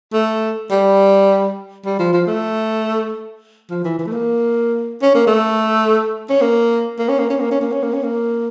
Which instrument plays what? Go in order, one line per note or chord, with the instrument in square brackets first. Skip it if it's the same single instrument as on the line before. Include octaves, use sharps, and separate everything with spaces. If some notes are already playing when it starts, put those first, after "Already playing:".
[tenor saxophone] A3
G3
G3
F3
F3
A3
F3
E3
E3
A3
A#3
C#4
A#3
A3
C#4
A#3
A#3
C#4
A#3
C#4
A#3
C#4
A#3
C#4
A#3
C#4
A#3